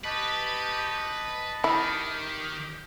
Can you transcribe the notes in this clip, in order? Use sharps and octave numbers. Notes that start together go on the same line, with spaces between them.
G4 B4 D#5 A5 C#6
D#3 E4 G4